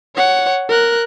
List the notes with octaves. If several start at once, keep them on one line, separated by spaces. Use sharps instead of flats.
C#5 F#5
A#4 F#6